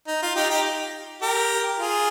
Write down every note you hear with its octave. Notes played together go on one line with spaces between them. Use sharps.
D#4
F4
D#4 G4
D#4 G4
G4 A#4
F4 G#4